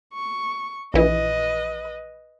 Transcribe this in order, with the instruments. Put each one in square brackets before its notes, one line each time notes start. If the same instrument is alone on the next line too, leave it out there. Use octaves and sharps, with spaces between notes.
[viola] C#6
[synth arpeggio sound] A#1 E3 [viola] B4 D#5